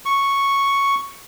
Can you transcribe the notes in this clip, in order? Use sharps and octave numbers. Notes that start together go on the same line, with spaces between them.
C#6